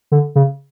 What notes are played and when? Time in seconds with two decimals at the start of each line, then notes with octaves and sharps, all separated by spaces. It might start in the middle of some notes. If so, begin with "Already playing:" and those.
0.12 D3
0.35 C#3